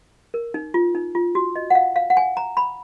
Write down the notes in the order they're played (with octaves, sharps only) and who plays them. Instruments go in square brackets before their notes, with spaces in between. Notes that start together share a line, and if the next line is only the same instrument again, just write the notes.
[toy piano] A#4
D#4
F4
D#4
F4
F#4
D#5
F#5
F5
F5
F#5
G#5
A#5
B5